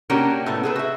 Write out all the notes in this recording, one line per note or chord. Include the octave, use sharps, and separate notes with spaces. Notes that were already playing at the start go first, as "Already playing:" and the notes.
A#3 C#4 D4 F#4 G4 A#4
A2 A3 B3
G#4 A4 B4
F#4 E5